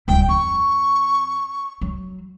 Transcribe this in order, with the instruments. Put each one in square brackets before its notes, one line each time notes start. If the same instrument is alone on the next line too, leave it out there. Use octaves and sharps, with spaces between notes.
[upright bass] D1 G3 [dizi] G5
[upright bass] F2 [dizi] C#6
[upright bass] F#3